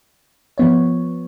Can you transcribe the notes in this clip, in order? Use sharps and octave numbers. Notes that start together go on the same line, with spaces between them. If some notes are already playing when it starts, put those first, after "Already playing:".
F3 B3 C#5